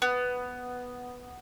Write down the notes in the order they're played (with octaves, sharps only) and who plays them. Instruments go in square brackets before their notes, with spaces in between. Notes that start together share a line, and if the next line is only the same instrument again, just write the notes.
[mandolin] B3